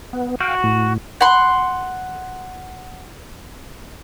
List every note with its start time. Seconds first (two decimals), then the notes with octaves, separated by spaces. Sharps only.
0.13 B3
0.41 F#4 F5 G5
0.64 A2
1.21 F#5 C6